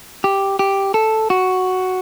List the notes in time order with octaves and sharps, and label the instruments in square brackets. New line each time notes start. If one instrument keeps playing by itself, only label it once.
[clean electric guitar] G4
G4
A4
F#4